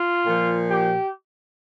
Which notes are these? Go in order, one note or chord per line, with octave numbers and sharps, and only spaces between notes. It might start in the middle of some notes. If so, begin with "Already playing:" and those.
Already playing: F4
A#2 F3
G4